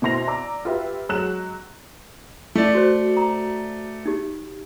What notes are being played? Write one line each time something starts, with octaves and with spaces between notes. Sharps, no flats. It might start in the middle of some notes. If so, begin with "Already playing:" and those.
B2 C4 E4 C6 A#6 F7
D5 A#5 D6 E6
F4 G4 B4 E5
F#3 G#3 F#6 E7
A3 D5
F#4 C5
A#5
D#4 G4